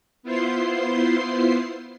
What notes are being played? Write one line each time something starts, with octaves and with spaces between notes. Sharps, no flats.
B3 E4 F4 C5 C6 C7